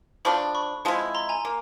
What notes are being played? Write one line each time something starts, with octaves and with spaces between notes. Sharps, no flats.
F3 A3 D4 B5 C#6
B5 C#6
F3 G#3 C4 E4
A#5 C6
G#5 A#5
A#3